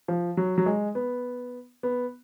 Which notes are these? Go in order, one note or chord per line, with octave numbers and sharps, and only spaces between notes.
F3
F#3
F#3
G#3
B3
B3